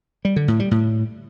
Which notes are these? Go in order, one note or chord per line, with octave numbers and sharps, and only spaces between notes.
G3
D3
A2
G3
A2